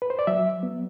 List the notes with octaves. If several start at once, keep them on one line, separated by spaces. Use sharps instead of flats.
B4
C5
D5
F#3 E5
B3